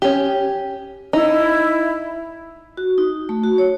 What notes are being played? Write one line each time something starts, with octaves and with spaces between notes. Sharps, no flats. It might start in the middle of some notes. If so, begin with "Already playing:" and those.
C#4 G4
D#4 E4
F#4
D#4
A3
F#4
C#5